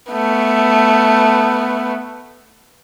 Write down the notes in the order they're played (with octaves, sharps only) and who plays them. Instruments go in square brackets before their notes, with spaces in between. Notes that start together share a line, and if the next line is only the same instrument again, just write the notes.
[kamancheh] A3 B3